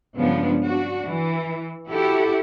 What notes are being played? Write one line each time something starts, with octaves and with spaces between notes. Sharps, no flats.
G2 C#3 F3 G#3 B3 D4
D4 F#4
E3
E4 F#4 G4 A4 E5